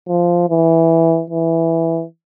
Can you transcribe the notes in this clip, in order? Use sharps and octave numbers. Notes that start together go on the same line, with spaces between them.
F3
E3
E3